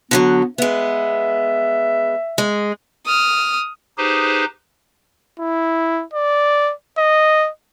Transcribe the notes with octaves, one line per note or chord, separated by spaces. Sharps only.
D3 E3 F#3 B3
G#3 B3 E5
G#3
D#6 F6
D#4 G4 G#4 B4 C5
E4
D5
D#5